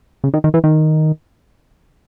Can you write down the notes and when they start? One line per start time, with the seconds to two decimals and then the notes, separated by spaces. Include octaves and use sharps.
0.24 C#3
0.34 D#3
0.44 D#3
0.54 E3
0.64 D#3